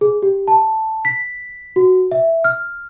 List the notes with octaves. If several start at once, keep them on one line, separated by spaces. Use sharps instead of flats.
G#4
G4
A5
B6
F#4
E5
F6